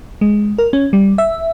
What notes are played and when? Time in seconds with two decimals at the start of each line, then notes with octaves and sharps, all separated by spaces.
0.21 G#3
0.58 A#4
0.73 C#4
0.93 G3
1.18 E5